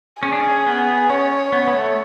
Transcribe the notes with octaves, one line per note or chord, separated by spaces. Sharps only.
C#4 G#4
D4
C#4
B3
C#4 C#5
B3
B3
A3